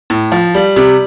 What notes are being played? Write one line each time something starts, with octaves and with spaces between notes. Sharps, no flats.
A2
F3
G3
C3